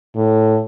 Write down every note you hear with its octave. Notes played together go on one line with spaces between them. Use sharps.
A2